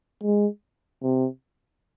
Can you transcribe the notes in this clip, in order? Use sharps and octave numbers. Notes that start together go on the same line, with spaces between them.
G#3
C3